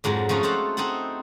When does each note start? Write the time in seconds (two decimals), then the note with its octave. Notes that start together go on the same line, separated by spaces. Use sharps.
0.04 F2 G#2 F3 F#3
0.29 F3 A3 C#4 D#4 F#4
0.43 F4 A4 C5 F#5 A5
0.77 C4 D#4 E4 A4 F#5